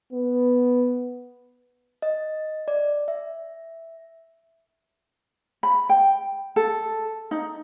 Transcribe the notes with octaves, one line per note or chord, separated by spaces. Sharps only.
B3
D#5
D5
E5
B5
G5
A4
D#4